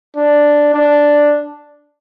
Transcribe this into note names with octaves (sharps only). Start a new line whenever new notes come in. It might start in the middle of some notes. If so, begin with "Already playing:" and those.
D4
D4